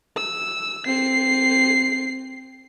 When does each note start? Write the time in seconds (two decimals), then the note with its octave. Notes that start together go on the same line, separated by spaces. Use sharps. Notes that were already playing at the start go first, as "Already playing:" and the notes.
0.17 E6
0.87 C4 C7